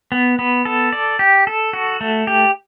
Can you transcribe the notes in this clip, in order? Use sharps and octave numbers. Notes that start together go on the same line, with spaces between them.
B3
B3
A4
D5
G4
A4
F#4
A3
G4